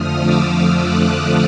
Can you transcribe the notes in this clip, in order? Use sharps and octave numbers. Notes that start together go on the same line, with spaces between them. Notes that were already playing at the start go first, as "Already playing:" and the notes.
Already playing: F2 D3 F3 A3 D#6 F6
D6 E6
D#6 F6
E6 F#6